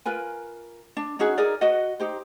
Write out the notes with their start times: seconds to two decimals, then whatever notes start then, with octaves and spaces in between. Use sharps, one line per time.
0.05 F4 A#4 B4 G#5
0.97 D4
1.19 C#4 D#4 F#4 G#4
1.38 D#4 G#4 A#4 D5
1.61 F#4 B4 D#5 F#5
2.00 D#4 G4 C5